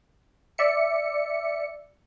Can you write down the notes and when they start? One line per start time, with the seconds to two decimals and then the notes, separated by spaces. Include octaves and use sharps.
0.58 D5 E5 C#7